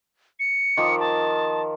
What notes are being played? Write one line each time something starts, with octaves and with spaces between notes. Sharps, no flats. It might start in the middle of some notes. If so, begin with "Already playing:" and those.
C#7
D#3 F3 D6
A5